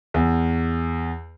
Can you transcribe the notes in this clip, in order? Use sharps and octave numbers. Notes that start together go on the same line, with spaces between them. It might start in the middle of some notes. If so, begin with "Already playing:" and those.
E2